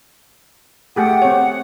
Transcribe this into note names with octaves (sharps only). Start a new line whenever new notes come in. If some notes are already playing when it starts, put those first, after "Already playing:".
A3 G4 G#4 F#5
C4 C#5